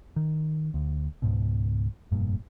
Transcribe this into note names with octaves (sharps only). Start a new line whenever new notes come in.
D#3
D2
C#2 G#2 B2
F1 G2 A#2